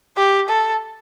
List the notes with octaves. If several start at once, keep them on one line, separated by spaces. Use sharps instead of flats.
G4
A4